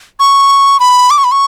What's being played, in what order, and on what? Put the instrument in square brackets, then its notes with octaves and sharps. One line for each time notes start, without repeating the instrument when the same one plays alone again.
[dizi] C#6
B5
D6
C#6
B5
C#6